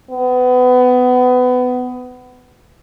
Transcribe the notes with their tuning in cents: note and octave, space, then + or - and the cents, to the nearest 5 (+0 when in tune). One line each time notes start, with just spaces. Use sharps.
B3 +25